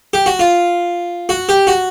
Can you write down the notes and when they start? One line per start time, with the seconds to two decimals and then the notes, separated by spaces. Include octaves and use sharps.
0.14 G4
0.26 F#4
0.39 F4
1.29 F#4
1.49 G4
1.67 F#4